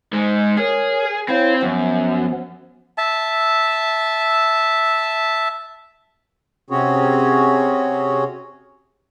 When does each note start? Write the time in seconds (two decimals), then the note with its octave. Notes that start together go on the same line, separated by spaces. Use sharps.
0.13 G#2 G#3
0.57 G#4 A#4 C#5
1.28 C4 E4 C#5 F5
1.62 F#2 F3 B3
2.98 E5 A5
6.70 C3 C4 C#4 F#4 G#4 C#5